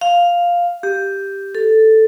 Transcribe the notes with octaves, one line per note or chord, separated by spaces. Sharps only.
F5
G4
A4